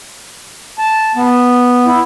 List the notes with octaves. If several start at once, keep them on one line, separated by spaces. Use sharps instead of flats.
A5
B3
E4